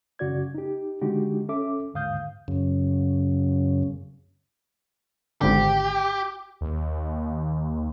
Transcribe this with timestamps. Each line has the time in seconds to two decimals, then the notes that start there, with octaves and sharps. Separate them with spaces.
0.19 F#2 C#3 F#4 D5 G#6
0.54 D#4 G4
1.01 D3 G#3 D4 D#4 F#4 G4
1.48 C#4 A4 E5 D6
1.94 D#2 G#2 D3 F5 D#6 G6
2.48 F#2 C#3
5.41 G#1 G#2 D3 G4
6.61 D#2